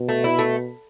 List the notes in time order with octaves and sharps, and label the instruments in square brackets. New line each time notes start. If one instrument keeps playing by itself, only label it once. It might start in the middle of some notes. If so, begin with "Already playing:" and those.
Already playing: [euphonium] B2
[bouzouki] A3
E4
A3